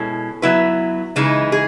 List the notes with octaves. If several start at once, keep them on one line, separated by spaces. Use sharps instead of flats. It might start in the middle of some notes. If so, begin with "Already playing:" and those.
Already playing: B2 G#3 C#4 E4 A4
F#3 B3 E4 B4
C#3 E3 G#3 D#4
G#4